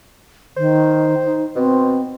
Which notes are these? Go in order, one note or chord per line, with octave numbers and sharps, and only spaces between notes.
D#3 C5
D#4
B2 C4